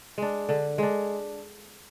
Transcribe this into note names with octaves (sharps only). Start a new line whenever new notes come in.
G#3 D4
D3
G#3 D4